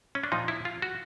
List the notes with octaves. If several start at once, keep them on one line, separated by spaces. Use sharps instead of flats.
C#4
D4
A#2 F3 D#4
E4
F4
F#4